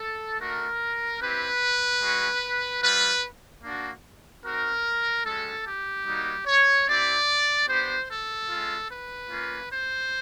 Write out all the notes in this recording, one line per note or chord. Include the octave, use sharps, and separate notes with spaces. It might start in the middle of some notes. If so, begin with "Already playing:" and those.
Already playing: A4
A3 D4 F#4 A#4
C4 E4 G4 B4
G#3 C#4 F#4
G3 C4 F4 B4
A#3 D4 F#4
C4 D#4 F#4 A#4
G#3 C#4 F#4 A4
G4
G3 A#3 D#4 F#4
C#5
C4 E4 G4 D5
B3 D4 G4 C5
A4
G#3 C#4 F4
B4
A#3 C#4 F4
C5